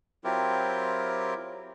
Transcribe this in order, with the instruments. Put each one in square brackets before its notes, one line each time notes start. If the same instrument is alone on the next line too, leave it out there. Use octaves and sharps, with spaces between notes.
[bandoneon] F#3 C4 E4 F4 G4 A#4